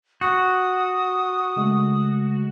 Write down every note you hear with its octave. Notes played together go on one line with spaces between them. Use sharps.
F#4 D#6
C#3 G#3 A3